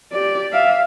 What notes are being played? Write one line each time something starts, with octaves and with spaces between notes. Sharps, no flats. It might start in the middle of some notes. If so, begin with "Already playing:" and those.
G4 D5
E5 F5